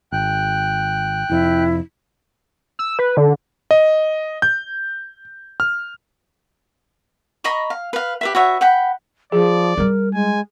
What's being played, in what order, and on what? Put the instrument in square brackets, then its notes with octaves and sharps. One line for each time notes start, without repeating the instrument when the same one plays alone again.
[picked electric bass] G#1 [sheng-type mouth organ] G5 F#6
[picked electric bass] F1 F2 [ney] E4
[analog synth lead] E6
B4
D3
[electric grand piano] D#5
G6
F6
[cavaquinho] D#5 A#5 B5 C#6
F5
B4 F5
G4 B4 E5
F#4 B4 C#5 E5
F#5 G5 B5
[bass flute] F3 [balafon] G#4 [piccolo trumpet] D5
[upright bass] G3 E4 [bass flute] A#4
[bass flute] G#3 [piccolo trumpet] G#5